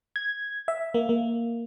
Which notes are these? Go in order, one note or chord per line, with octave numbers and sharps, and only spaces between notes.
G#6
E5
A#3
A#3